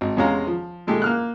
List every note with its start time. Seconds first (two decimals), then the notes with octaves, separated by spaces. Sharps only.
0.01 G#1
0.17 E2 C3 G#3 C#4 F5 A#5
0.47 F3
0.87 A#2 G#3 A3 G4
1.02 A#3 F6 F#6